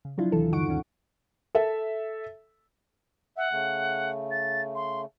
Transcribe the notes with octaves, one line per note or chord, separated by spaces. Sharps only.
C#3
F3 F#3 D4 E4 F4
D#2 C3 D#3 E3 A4
G2 D3 D#4 F#5 C#6 D7
D2 D#3 C#4
A4 E5
E5 F#5
C#3 A3
A6
C6